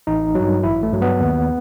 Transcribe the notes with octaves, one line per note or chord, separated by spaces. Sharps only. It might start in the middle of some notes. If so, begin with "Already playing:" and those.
A1 D#4
G2 F#3
A1 E4
A3
G2 F#3
B3
D#2